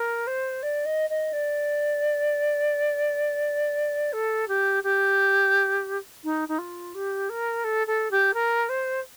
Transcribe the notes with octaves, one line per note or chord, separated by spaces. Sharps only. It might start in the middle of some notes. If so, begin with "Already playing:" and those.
Already playing: A#4
C5
D5
D#5
D#5
D5
A4
G4
G4
D#4
D#4
F4
G4
A#4
A4
A4
G4
A#4
C5